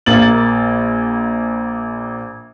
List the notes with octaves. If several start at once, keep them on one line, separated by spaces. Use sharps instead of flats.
A#1 A#3 A6 F#7